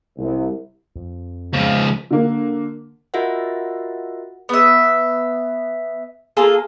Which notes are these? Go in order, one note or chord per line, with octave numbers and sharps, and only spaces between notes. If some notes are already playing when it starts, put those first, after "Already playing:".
C2
F2
C#2 F3
D3 A#3
F4 F#4 A#4 D#5 E5 F#5
B3 E5
A#3 F4 G#4 A4